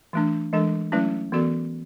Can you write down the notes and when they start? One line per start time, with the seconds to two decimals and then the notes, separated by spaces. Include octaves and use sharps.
0.13 E3 A3 D4
0.53 E3 G#3 D4 A4
0.92 F#3 A3 C#4 E4 B4
1.32 E3 B3 F#4 A4 D5